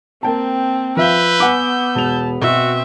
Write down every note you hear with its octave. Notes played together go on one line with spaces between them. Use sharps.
A#3 C4 G5 A5
F3 B4 E5 F5 E6 G6
B3 F#5 G#5 D6
E1 A5 F7
B2 C4 F#4 E5